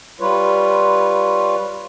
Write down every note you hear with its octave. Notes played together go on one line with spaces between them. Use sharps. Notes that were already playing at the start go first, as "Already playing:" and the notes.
G3 F4 B4 C#5